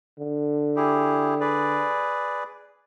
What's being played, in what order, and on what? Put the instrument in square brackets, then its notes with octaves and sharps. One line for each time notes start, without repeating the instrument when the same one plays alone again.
[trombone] D3
[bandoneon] E4 G4 G#4
G#4 B4 D5